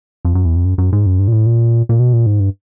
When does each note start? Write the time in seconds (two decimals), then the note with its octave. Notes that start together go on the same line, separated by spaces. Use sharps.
0.25 F2
0.35 F#2
0.45 E2
0.56 F2
0.65 F#2
0.78 F#2
0.93 G#2
1.06 F#2
1.19 G2
1.28 A#2
1.32 A2
1.46 A#2
1.89 A#2
2.00 B2
2.13 A#2
2.26 G#2
2.40 G2